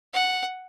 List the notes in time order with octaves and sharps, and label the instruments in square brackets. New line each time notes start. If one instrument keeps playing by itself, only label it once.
[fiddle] F#5